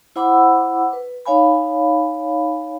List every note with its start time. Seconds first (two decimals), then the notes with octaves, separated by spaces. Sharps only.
0.16 E4 C5 F#5 B5 D6 E6
0.93 B4
1.26 D#4 C#5 F5 G#5 B5